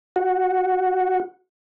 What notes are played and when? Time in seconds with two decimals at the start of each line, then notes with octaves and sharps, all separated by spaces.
0.16 F#4 F#5